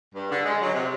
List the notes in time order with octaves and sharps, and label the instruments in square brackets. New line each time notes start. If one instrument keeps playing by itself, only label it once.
[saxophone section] G2
D3
G#3
F#3
C3